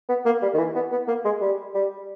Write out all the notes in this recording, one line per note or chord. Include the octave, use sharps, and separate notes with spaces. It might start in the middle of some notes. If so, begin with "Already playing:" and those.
B3
A#3
G3
D#3
E3
B3
B3
A#3
G#3
G3
G3